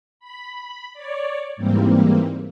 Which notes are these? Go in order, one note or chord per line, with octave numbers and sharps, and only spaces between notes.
B5
C#5 D5
G#2 E3 G3 A#3 C4